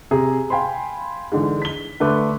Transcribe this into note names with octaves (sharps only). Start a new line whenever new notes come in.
C3 G#4 A#5
F5 G5 G#5 B5 C6
G#2 D3 E3
B6 G7
D3 A3 B4 D6